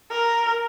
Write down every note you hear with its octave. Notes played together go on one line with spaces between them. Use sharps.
A#4